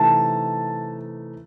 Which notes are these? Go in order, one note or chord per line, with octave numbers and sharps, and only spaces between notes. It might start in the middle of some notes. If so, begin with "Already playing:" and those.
Already playing: C3 E3 A3 D#4 A5